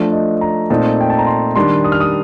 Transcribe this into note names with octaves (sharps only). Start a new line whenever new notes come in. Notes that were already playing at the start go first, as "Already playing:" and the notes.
Already playing: F3 A3 D4 D5
D#5
A#5
A#2 A3 C4 D#4 A5
G5
A5
A#5
C6
D#3 G3 D4 C6
D#6
F6
D#6